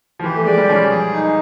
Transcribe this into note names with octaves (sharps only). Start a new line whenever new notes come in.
F3
E3 G4
A3
G#3 D5
G3
F3 C#4
G#4
D#4